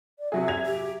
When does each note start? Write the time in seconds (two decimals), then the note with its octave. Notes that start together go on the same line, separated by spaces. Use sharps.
0.19 D5
0.32 C3 F#3 G#4 E5
0.48 G#6 F7
0.66 G4